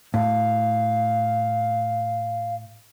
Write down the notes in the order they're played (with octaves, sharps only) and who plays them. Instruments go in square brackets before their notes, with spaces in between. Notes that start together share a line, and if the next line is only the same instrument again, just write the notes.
[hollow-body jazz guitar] A2 [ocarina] F5